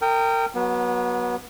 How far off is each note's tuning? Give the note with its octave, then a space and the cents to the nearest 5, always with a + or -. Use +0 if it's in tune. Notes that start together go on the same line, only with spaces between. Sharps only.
A#4 -30 G5 +0 D#6 +0
F#3 +0 B3 -25